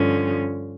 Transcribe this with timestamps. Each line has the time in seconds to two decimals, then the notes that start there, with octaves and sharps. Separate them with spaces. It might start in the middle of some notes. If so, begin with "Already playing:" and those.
Already playing: G2 D3 F3 C#4